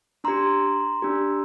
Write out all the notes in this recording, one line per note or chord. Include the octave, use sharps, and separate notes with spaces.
D4 G4 A#5 C6
D4 G4